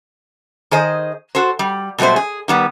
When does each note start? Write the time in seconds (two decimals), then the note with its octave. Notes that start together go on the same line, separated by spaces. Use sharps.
0.71 D#3 G#4 C5 D#5
1.35 F#4 A4 C5
1.59 G3
1.98 B2 F#3 G3 A3 C5
2.16 G#4
2.48 D#3 G3 B3